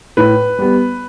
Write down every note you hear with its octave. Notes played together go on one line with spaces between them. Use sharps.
A2 B4
G3 B3